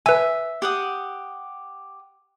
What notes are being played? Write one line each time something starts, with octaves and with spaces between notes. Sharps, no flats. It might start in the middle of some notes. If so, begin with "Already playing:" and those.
B4 E5 G#5
G4 F#5 D#6